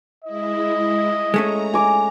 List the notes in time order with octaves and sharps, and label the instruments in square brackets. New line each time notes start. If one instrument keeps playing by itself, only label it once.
[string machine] G#3 E4 [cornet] D#5
[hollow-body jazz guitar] G#3 A3 C#4 [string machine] A#5
[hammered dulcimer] G#5 D6